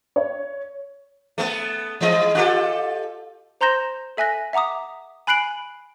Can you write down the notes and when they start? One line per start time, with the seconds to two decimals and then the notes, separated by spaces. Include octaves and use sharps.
0.16 C#5
1.38 A3 B3 A4
2.01 E3 G#3 D#5
2.35 F4 G4 A4
3.61 C5 A#5 C6 G6 A#6 E7
4.17 A4 E5 G#5 F#6 A#6
4.53 E5 F#5 A#5 D6 D#6
5.27 G#5 B5 F#6 C7 D7 F#7